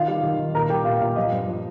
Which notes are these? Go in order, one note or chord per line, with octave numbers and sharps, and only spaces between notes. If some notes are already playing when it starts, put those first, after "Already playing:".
Already playing: D#3 F4 F5
G3
D#3
D#3
A#2 A#4 A#5
G3 G4 G5
A#2 F4 F5
A#2 F4 F5
F3 D#5
G2
F3